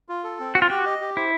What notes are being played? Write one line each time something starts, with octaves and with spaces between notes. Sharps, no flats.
F4
A4
C4
F#4 G5
F4
F#4 G4
D#5
G4
E4 C5